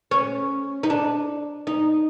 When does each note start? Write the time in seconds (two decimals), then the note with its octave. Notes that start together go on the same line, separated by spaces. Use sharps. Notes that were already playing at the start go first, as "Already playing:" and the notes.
0.11 C#4
0.83 D#4
0.90 D4
1.67 D#4